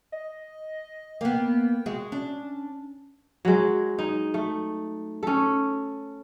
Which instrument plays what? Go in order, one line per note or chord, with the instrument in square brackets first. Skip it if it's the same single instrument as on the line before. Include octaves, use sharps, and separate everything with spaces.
[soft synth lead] D#5
[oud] A#3 B3 [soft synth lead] G5
[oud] G#3 F#4
[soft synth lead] C#4 [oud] D4
[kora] F#3 G#3
D#4
A3
C#4 A4